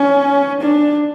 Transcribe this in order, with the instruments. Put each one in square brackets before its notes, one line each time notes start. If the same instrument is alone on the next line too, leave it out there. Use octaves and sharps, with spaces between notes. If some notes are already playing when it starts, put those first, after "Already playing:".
Already playing: [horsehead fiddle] C#4
D4